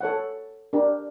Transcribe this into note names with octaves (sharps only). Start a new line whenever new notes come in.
A4 C#5 F#5
D4 G4 A#4